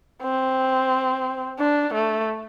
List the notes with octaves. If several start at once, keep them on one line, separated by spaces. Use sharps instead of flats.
C4
D4
A3